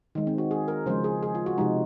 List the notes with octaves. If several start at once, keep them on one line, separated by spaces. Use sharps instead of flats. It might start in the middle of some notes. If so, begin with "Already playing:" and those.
D#3 G#3
C4
F#4
G#4
A#4
C#3 F3 G#3 C5
G#4
G#4
F4
F#4
C3 F3 G#3 D#4